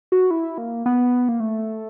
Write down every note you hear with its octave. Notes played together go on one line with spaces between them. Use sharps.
F#4
E4
A#3
B3
A#3
A3